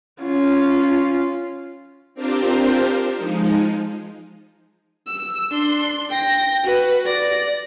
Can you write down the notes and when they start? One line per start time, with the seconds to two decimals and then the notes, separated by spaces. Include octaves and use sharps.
0.22 C#4 F4
2.14 C4 D4 F4 G4 A#4 C5
3.15 F3 G#3 D#4
5.07 E6
5.51 D4 C6
6.09 G5 A#6
6.64 F#4 B4
7.06 D5 A#6